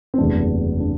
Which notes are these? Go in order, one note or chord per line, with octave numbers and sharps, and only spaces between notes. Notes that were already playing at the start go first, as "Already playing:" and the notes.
C4
F#1 E2 C3 F#3 A3 D4
D4